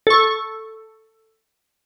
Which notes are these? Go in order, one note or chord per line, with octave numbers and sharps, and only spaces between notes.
A4 C#6